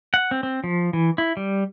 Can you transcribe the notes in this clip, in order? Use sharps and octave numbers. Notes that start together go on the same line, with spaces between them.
F#5
C4
C4
F3
E3
E4
G3